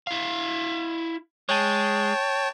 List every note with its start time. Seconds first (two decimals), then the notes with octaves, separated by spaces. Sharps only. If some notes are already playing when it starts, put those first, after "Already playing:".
0.07 E4 F5
1.49 G#3 C#5 G5 A5